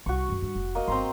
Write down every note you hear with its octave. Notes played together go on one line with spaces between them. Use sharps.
C2 F#4 C#6
F#2 C#3
G2
F1
A#3 D#5
G1 C4 A#5 C6